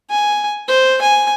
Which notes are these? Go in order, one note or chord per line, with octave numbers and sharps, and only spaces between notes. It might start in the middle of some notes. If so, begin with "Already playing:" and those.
G#5
C5
G#5